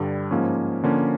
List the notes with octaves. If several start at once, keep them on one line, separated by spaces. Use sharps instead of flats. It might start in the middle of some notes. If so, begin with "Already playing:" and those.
Already playing: G2 D3 G3
G#2 F3 A#3 C#4
D3 F3 A#3 C#4